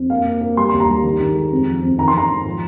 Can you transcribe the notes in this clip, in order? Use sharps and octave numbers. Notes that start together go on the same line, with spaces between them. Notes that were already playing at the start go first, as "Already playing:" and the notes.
Already playing: F2
A#3 F5
A#3
A#3
G3 C6
D#2 C6
A#5
G3
D#3
D#3
G#3
F2
F3
F2
D#3 A#5
C6
D#3 A#5
G#2
F3